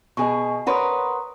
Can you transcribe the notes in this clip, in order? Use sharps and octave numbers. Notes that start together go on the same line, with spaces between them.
B2 G#4 D#5 G#5 C#6
A#4 B4 C#5 F#5 C6 D#6